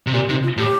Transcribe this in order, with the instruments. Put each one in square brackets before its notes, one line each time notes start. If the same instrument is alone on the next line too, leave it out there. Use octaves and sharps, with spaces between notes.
[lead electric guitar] C3
[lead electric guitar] A#2 [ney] G4
[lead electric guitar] C3 [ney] D#4
[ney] F4
[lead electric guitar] A2 [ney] G4